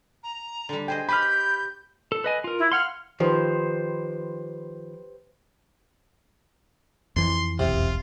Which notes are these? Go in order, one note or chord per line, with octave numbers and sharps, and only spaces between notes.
A#5
D3 G3
G#4 C5 D#5 G5
G4 B4 C5 B5 F6 G6
A4
B4 D#5 G#5
F4 A#4
E4
F5 F#5 C6 F6
D#3 F3 G4 B4 C5
F2 E3 C6
E1 B1 C3 F4